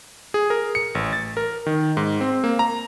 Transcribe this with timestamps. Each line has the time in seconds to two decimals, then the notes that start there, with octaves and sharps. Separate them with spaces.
0.34 G#4
0.50 A#4
0.75 C#7
0.95 A1
1.13 A6
1.37 A#4
1.66 D#3
1.97 G#2
2.21 C4
2.44 A#3
2.59 A#5